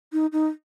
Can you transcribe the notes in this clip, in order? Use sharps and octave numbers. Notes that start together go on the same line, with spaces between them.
D#4
D#4